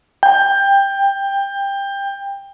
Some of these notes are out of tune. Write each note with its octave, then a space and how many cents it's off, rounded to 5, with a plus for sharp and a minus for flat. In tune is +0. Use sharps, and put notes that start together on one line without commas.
G5 +20